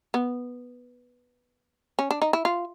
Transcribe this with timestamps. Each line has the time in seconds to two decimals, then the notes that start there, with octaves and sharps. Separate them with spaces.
0.14 B3
1.99 C#4
2.11 D4
2.22 D#4
2.33 E4
2.45 F4